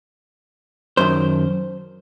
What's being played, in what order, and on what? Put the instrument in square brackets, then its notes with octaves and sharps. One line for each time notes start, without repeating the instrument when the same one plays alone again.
[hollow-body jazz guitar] F#2 D#3 C5